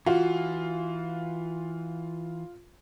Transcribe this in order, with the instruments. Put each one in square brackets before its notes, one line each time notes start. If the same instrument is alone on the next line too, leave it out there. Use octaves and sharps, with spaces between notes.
[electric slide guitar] E3 [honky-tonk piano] F4 [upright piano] F#4